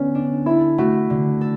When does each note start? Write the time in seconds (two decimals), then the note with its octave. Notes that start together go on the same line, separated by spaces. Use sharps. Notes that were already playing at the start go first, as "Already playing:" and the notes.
Already playing: D3 B3 C#4
0.15 D4
0.46 E4 A4
0.78 A3 F#4
1.10 D3
1.41 A4